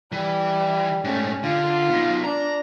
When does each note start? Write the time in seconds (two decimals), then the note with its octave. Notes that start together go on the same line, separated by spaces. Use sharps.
0.12 E3 G3
1.04 G#2 A3 C#4
1.43 D3 F4
1.90 B3 D#4
2.24 D4 A#5